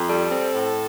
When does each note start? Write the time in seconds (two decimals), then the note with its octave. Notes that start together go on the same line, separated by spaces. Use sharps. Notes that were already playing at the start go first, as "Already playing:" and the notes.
Already playing: F2
0.09 G3 A4
0.31 C4
0.54 A2